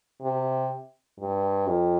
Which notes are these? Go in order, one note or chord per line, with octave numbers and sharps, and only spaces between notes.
C3
G2
F2